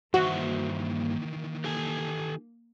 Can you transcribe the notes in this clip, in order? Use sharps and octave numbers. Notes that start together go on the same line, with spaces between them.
G2 D#3 E3 A#3 F#4 C5 E5
G4 A4 G#5